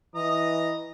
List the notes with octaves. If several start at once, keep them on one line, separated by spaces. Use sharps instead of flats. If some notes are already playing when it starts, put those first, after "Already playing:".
E3 D#5 A#5 D#6